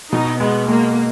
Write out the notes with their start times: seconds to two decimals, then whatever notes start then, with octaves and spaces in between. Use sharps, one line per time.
0.12 B2 D#4
0.40 G#3 B3
0.68 G#3 A#3